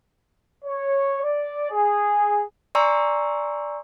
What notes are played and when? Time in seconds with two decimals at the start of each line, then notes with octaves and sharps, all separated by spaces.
0.65 C#5
1.22 D5
1.71 G#4
2.75 D5 G#5 A#5 C6 C#6 E6